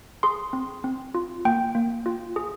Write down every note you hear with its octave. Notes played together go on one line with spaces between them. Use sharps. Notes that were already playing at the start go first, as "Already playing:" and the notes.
G#4 C6
C4
C4
F4
A#3 G5
A#3
F4
G#4